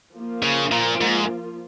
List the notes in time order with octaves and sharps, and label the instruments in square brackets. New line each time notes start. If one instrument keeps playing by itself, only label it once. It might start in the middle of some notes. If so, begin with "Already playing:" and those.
[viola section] F3 A#3 F4
[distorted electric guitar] C#3
A#2
G#2